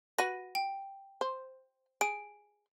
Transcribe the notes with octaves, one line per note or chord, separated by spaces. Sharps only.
F#4 B4 A#6 D#7
G5
C5
G#4 D7